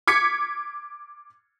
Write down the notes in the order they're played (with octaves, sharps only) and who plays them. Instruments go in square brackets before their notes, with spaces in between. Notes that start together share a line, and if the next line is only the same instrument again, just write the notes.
[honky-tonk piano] D6 G#6 B6 C#7